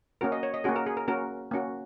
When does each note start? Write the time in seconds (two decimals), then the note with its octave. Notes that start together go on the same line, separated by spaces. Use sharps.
0.21 A#3 C#4 F#4 A#4
0.32 D#5
0.43 C#5
0.54 D#5
0.64 A#3 C#4 F#4 G#4
0.76 A#4
0.86 G#4
0.97 A#4
1.08 A#3 C#4 F#4 A#4
1.51 A#3 C#4 F#4